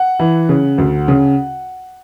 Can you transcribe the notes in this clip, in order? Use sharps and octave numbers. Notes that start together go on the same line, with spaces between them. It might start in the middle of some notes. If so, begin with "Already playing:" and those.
Already playing: F#5
E3
C#3
D2
C#3